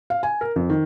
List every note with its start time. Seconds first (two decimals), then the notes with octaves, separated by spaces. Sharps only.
0.10 F5
0.23 G#5
0.41 A#4
0.56 F2
0.70 D#3